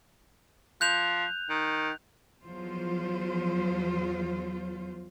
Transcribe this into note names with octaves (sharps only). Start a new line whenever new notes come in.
F3 F#6 G6 F7
D#3
E2 F3 F#3 F4 C5